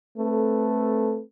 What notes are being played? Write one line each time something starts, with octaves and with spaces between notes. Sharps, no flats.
A3 C4 A4 B4